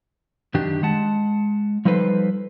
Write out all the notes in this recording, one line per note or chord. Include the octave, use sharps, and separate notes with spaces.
F#2 D#3 D4 G4
G#3 F#5 A5
F3 G3 D#4 A4 B4 C5